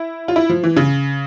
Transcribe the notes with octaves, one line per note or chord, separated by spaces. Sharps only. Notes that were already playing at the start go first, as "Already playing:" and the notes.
Already playing: E4
F4
E4
F3
E3
C#3